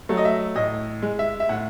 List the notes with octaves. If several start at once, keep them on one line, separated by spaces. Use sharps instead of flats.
F#3 A3
D#5
E5
A2 D#5
G#3
E5
E5
A2 F#5